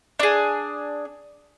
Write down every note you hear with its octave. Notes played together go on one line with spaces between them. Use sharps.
D4 G#4